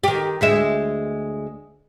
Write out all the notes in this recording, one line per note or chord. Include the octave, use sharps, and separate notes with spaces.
D#3 G4
D2 G#3 E5